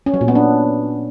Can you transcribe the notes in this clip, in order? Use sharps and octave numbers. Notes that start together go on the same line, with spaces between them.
C#4
F#3
A#2
B3
D4